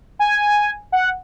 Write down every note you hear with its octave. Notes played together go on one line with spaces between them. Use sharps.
G#5
F#5